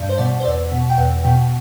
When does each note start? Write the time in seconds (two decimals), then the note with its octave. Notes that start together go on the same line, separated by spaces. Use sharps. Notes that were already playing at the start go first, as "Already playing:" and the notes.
Already playing: G2
0.09 C5
0.18 B2 D5
0.40 C5
0.45 E2 D5
0.72 B2
0.90 G5
0.97 E2 F#5
1.24 B2 G5